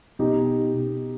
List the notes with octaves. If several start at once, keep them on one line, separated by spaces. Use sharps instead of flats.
B2 D#4 G4
B2